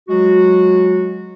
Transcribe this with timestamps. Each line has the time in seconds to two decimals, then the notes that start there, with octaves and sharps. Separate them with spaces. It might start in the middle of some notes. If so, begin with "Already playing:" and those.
0.08 F#3 G#3 F#4